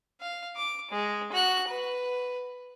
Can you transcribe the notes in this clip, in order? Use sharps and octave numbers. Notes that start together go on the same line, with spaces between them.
F5
D6
G#3
F#4 F#6
B4